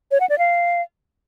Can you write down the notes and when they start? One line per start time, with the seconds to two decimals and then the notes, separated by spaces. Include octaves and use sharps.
0.11 C#5
0.20 F#5
0.29 D5
0.38 F5